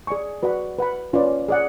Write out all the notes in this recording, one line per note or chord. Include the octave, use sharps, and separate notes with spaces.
G#4 D5 G#5 C#6
F#4 B4 D5 F#5 B5
B4 F#5 B5
C#4 F4 B4 D5
G#4 D5 F#5